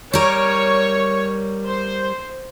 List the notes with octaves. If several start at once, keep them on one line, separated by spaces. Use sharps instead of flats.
G3 A#4 C#5
C5